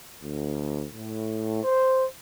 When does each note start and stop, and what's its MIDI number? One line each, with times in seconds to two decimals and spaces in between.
0.23 0.86 38
0.93 1.62 45
1.63 2.05 72